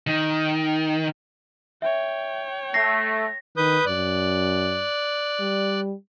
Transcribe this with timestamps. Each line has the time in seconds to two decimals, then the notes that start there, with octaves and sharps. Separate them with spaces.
0.07 D#3
1.82 C#5 E5 G5
2.74 A3 A#6 C7
3.57 D#3 B4 D#6 G6
3.86 F#2 D5 F#6
5.40 G3